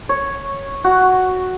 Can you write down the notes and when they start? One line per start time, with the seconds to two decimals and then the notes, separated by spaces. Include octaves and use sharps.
0.09 C#5
0.84 F#4